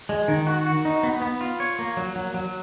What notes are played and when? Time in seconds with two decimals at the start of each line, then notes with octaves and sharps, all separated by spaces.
0.09 G#3
0.28 D#3
0.47 F#4
0.66 F#4
0.85 D#4
1.03 B3
1.22 B3
1.41 F4
1.60 C#5
1.79 A#3
1.97 F#3
2.16 F#3
2.34 F#3